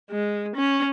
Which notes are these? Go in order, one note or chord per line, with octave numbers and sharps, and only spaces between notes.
G#3
C#4